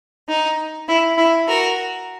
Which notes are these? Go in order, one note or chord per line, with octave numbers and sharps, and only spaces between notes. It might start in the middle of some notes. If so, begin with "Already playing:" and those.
D#4
E4
E4
F#4 A#4